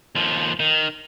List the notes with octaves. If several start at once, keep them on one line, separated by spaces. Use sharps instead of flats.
D#2 F3
D#3